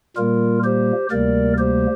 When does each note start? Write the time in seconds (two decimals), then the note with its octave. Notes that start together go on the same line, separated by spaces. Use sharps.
0.16 A#2 G3 A#3 F4 A#4
0.64 G4 C5
1.11 D2 C3 G3 A#3 A#4 D5
1.58 G4 C5